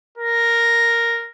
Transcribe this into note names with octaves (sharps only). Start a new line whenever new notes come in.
A#4